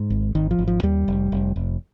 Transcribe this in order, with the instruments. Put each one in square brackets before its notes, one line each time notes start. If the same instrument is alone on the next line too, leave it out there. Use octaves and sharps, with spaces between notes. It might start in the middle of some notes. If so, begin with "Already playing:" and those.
Already playing: [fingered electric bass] G#2
G#1
G#1 D#3
F3
G#1
F3
D#2 G3
F1
F1
F1